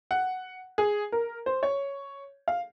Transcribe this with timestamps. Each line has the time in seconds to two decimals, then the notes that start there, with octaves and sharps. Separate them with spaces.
0.11 F#5
0.78 G#4
1.12 A#4
1.46 C5
1.63 C#5
2.48 F5